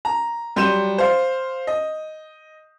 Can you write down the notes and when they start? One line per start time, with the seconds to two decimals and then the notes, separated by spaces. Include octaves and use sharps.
0.05 A#5
0.56 F#3 G3 C6 G6 D#7 E7
0.98 C5 F5
1.67 D#5